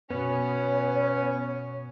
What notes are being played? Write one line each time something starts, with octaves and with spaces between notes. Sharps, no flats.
F#2 B2 B3 C#4 C#5